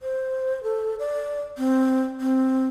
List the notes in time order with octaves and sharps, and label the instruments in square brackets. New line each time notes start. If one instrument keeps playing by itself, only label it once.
[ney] C5
A4
D5
C4
C4